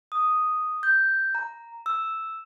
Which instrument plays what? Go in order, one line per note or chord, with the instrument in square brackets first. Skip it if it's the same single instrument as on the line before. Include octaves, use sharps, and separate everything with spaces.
[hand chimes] D#6
G6
A#5
E6